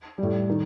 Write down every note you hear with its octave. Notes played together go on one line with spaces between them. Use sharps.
A2 G3
D#3